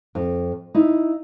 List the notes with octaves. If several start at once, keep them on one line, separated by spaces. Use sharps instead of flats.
F2
D#4 E4